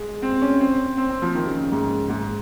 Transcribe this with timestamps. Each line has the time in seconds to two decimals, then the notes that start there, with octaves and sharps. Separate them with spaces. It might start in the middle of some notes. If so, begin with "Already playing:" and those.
Already playing: G#3
0.22 C4
0.42 C#4
0.60 C4
0.97 C4
1.10 C4
1.22 F3
1.35 D#3
1.47 C#3
1.72 G#2
2.09 G#2